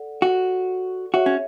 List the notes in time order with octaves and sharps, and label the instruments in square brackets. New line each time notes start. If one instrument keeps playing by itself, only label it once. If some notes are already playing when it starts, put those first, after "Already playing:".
Already playing: [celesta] A4 D5 F#5
[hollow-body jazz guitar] F#4
[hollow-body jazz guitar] F#4 [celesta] G#4 C#5 E5
[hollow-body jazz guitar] C#4